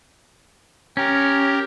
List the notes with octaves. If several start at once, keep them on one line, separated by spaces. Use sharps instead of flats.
C#4 G4 A#4